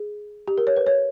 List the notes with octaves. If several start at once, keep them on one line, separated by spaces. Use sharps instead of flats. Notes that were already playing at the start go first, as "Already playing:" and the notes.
Already playing: G#4
G4
A#4
C#5
B4
C#5